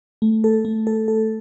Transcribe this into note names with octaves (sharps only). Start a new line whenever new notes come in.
A3
A4
A3
A4
A4